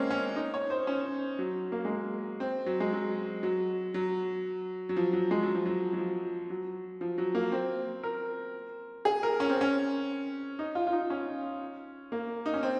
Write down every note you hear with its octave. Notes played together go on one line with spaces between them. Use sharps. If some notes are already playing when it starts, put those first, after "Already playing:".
Already playing: G#3 A#3 C4 C#4
C#4
D#4
C#5
C5
C#4
F#3
A#3
G#3
A#3
C4
F#3
G#3
F#3
F#3
F#3
F#3
F3
F#3
G#3
F#3
F3
F#3
F#3
F3
F#3
F3
F#3
A#3
C4
A#4
G#4
A#4
C#4
C4
C#4
D#4
F4
F4
D#4
C#4
A#3
D#4
C#4
C4